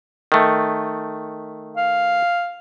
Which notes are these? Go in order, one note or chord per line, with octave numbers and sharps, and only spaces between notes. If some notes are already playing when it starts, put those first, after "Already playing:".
D#3 A3
F5